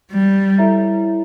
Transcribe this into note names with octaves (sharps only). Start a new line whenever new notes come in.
G3
E4 A4 C#5 E5 A#5